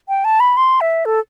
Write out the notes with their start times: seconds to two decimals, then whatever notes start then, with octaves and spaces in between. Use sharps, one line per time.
0.09 G5
0.25 A5
0.40 B5
0.57 C6
0.81 E5
1.05 A4